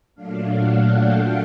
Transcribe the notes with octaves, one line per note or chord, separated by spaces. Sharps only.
A#2 F#3 A3 D4 F5
F#5
G5